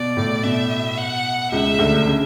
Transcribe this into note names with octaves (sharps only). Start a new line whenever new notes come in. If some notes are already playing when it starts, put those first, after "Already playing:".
Already playing: B2 D5
A2
B2 E5
F#5
C#2 C#3 E5
D2 D3
C#3